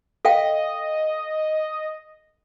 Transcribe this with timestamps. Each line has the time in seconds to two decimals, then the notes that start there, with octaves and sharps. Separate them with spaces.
0.25 A4 D#5 F5 G5